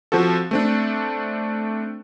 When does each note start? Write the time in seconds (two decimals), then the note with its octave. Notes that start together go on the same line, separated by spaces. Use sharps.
0.12 F3 C4 F#4 A4
0.51 A3 C4 D4